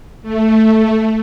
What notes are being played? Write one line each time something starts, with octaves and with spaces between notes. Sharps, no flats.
A3